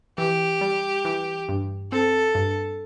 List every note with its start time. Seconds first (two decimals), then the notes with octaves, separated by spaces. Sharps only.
0.18 E3 G4
0.61 G3
1.05 E3
1.49 G2
1.92 C4 A4
2.35 G2